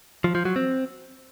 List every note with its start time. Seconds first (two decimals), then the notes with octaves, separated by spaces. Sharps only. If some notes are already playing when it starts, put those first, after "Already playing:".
0.24 F3
0.35 F3
0.45 F#3
0.56 C4